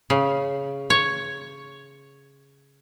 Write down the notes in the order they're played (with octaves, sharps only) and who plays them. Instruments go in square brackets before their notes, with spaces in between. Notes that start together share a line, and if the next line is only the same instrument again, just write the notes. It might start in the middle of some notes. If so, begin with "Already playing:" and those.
[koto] C#3
C#5